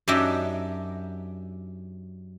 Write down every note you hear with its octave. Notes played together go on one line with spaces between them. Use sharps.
F#2 F#3 D4 D#4 G4 E5